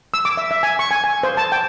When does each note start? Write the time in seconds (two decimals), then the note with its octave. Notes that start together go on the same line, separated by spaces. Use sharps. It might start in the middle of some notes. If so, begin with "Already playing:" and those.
0.14 E6
0.25 D6
0.37 E5
0.51 E5
0.63 G#5
0.79 C#6
0.91 G#5
1.04 G#5
1.23 C5
1.37 A5
1.52 G5